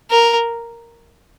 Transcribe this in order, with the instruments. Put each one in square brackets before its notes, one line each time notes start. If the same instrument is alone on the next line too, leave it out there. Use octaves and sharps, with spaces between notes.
[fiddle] A#4